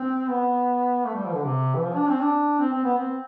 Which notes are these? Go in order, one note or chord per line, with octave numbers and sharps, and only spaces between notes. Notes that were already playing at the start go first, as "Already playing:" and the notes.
Already playing: C4
B3
A3
G3
F3
D3
C3
E3
F3
D4
C4
D4
C4
C4
B3
C4